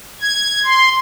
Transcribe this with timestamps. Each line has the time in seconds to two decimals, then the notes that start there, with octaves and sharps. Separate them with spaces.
0.21 G#6
0.65 C6